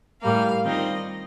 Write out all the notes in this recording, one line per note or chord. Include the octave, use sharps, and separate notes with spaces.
A2 G3 A#3 F5
D#3 G3 C4 F4 D#5